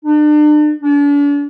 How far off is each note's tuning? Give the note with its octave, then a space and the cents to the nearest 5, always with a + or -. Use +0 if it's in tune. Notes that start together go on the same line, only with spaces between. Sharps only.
D4 +40
D4 -40